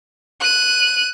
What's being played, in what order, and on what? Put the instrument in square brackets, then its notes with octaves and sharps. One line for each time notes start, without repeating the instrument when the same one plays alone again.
[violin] F#6 D#7